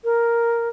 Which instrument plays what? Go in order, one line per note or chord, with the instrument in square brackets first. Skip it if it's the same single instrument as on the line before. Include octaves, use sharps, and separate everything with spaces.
[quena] A#4